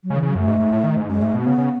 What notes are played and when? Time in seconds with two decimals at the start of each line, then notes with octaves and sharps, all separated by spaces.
0.04 F#3
0.10 C#3 G#3
0.15 D#3
0.20 E3
0.23 C#3
0.29 F#3
0.35 F#2 A3
0.47 G#2
0.60 G#2
0.72 A2
0.84 D#3
0.97 G#2
1.09 F#2 G#3
1.22 G#2 A3
1.34 B2
1.39 B3
1.46 C#3
1.58 C#3